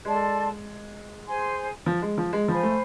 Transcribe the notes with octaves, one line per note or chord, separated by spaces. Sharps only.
G#3 A4 D5 A5 C6
G#4 C5 G#5 C6
F3
G#3
F3
G#3
F3 C5 F5 G#5 B5
A3